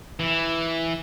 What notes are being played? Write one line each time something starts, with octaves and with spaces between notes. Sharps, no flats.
E3